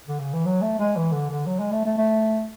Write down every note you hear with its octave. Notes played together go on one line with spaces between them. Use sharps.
D3
C#3
E3
F#3
A3
G#3
E3
D3
D3
F#3
G#3
A3
A3
A3